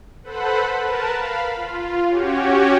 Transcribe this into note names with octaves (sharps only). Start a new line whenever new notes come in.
A4 B4 C5 F#5 B5
A#4 B4 A5
F5 B5
F4
C#4 F#4 G4 C#5